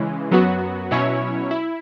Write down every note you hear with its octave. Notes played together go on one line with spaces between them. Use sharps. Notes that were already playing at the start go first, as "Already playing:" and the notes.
Already playing: C#3 E3 G#3
F#2 F#3 B3 F#4
B2 F#3 C#4 E4 C#5
E4